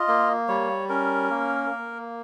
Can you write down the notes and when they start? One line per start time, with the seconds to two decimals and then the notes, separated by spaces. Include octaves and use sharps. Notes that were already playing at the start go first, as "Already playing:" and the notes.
Already playing: F4 D#5
0.08 A#3
0.48 G3 C#5
0.89 C#4 A#4
1.30 A#3
1.70 A#3